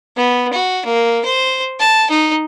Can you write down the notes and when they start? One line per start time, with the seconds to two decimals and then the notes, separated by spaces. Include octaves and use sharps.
0.17 B3
0.53 F#4
0.85 A#3
1.25 C5
1.79 A5
2.10 D#4